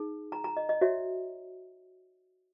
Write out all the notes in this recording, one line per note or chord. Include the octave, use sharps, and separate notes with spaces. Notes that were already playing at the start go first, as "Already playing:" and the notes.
Already playing: D#4 G#4
A#5
A#5
D#5
D#5
F#4 C#5 E5